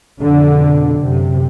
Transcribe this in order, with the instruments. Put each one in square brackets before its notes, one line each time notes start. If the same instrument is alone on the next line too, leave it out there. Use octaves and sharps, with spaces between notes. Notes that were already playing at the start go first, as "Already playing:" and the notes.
[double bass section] F2 B2 D3
F#2 C3